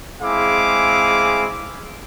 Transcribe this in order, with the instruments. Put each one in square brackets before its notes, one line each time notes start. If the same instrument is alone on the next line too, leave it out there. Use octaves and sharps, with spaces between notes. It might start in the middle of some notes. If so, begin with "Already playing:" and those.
[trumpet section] G#3 C4 E4 G#4 F5 D6